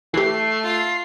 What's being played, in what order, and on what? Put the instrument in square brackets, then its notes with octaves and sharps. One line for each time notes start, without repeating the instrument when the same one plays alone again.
[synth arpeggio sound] E3 G4 [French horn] A3 [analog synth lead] C7
[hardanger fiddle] F4